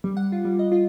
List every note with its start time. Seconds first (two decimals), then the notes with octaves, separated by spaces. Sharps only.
0.04 G3
0.17 F#5
0.32 F4
0.45 G3
0.59 D#5
0.72 F4